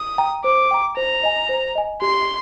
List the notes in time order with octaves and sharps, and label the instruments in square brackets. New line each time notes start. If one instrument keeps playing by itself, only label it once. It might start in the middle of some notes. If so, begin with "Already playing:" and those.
Already playing: [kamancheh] D#6
[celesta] G5 A#5
[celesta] C5 [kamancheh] D6
[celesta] G5 A#5
[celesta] C5 [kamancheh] A#5
[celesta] D#5 G#5
C5
D#5 G#5
[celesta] G4 [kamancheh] C6